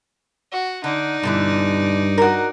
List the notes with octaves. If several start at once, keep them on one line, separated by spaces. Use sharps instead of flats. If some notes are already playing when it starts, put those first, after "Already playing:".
F#4
D3 D#4 D5
G2 B2 D3 E3
F#4 A#4